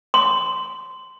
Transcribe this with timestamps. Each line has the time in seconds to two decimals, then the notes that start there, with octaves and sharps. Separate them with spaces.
0.14 C6